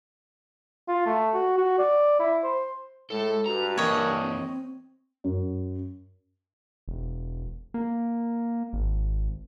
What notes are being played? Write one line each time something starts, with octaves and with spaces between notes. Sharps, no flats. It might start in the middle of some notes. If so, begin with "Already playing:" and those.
F4
A3
F#4
F#4
D5
E4
C5
A2 G#3 A4
G2 F#4 A#5
E3 A#3 A#4 C#5 D#5
C4
F#2
E1
A#3
G#1